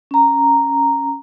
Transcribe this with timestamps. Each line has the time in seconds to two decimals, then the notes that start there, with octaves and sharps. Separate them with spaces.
0.11 C#4 A#5